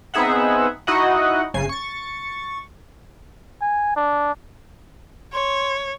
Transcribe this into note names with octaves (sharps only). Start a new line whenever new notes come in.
B3 C4 D#4 G#4 E5 F#5
D#4 E4 F#4 D#5 F#5
G1 C#3 G#5 C7
C#6 A6
G#5
D4
C#5 C6